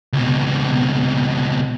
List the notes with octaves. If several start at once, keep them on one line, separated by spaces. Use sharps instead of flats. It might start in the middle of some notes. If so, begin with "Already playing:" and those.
C#2 B2